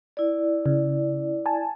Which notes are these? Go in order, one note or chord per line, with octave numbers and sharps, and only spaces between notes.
E4 D5
C#3
G#5 A5